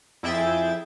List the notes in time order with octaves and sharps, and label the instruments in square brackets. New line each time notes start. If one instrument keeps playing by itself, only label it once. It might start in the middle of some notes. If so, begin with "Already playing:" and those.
[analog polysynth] F2 E4 G#4 E5 G5 A6